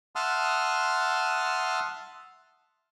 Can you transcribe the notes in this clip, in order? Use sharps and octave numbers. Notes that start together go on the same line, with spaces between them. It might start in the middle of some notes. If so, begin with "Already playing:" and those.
E5 F#5 A5 C6 D#6 F6